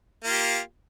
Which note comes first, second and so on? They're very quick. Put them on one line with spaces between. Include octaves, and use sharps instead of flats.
A#3 F4 G4